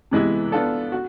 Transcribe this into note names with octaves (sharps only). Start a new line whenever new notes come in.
C3 E3 G#3 B3 E4
B3 D4 F4 A4
F#4